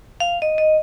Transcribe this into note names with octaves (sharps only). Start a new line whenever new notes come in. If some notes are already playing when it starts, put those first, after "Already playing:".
F5
D#5
D#5